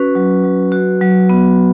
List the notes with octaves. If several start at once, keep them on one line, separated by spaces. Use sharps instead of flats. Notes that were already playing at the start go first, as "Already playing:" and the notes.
Already playing: C#4 F#4 B4
F#3
F#3
F#4
F#3
B3